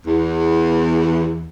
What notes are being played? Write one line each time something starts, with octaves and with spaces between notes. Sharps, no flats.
E2